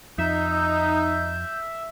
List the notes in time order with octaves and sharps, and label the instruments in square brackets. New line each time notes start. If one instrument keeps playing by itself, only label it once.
[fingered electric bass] F2 [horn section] D#4 [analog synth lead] E5 [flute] G6